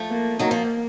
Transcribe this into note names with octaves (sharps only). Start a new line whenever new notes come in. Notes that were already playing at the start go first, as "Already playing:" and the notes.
Already playing: F3 A3
A#3
D#3 F#3 A#3
F3